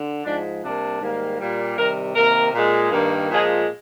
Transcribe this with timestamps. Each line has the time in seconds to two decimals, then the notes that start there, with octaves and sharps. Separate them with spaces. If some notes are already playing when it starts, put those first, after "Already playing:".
Already playing: D3
0.25 G#2 F3 G#3 D4
0.63 C3 G3 A#3 D4
1.01 G#2 D#3 G3 A#3
1.39 A#2 G3 A#3
1.78 C3 D#3 G3 A#4
2.16 C3 D#3 A#3 A#4
2.54 A#2 G#3
2.92 G2 D#3 A#3
3.29 A#2 F3 G#3 G#4